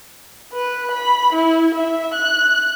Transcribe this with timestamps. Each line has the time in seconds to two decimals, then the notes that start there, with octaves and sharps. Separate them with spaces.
0.53 B4
0.91 B5
1.33 E4
1.75 E5
2.14 F#6